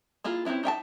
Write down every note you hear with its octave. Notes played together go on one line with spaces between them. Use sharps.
A#3 E4 F4 G#4
C4 C#4 D#4 E4 B4
D#4 E5 G5 A5